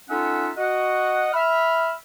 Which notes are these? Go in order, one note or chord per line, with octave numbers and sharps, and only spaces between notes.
C#4 D#4 F4 A4 E5 F#5
F#4 D#5 F#5
E5 B5 F6